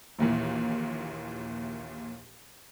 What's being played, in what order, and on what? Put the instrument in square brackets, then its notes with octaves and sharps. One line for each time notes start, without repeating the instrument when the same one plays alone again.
[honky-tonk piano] A#1 D#2 A#2 E3